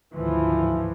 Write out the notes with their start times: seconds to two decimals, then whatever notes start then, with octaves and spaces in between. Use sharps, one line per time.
0.12 G#1 D2 A2 E3 F3